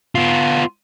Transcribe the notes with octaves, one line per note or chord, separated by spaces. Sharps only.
B3 F4